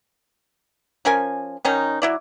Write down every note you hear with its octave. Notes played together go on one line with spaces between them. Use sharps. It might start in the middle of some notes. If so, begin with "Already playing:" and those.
F3 C#4 A#4 G#5
D#3 C#4 D#4
F#3 E4 D5